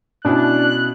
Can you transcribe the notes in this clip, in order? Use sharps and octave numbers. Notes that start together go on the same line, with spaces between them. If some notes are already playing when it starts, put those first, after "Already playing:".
B2 C#4 D4 E4 F#6